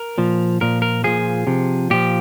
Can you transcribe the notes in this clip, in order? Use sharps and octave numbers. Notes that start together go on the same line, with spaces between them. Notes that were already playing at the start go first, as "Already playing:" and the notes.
Already playing: A#4
A#2 F3
A#2 F3 A#4
A#4
A#2 F3 G#4
C3 F3
A#2 F3 G4